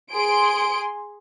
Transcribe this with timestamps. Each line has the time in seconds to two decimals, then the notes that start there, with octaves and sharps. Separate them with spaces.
0.11 G#4 C6 D7